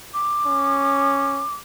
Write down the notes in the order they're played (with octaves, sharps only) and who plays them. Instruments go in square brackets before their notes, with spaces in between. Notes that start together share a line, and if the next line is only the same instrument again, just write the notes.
[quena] D6
[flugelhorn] C#4